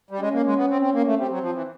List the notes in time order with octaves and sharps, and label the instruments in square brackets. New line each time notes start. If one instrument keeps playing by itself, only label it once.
[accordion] G3
[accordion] G#3 [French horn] C#4
[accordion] A#3
G#3
B3
C4
C4
A#3
A3
[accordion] G3 [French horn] C4
[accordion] F#3
F3
E3